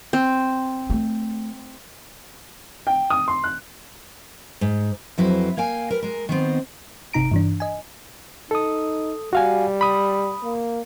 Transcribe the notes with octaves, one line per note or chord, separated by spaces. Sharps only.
C4
A3
G5
D#6
C6
F#6
G#2
F2 F#3 E4 B4 C5
A#3 F5 G5 G#5
A#4 B4
G#3 A#4
D#3 B3 C4
G1 C3 D#4 A#5 D7
G2 E3 D4
D#5 G#5
D#4 A4 D#6
G3 F#4 F5 G#5
B5 D#6
A#3